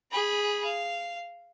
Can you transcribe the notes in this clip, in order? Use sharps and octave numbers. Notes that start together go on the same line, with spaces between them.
G#4 B5
F5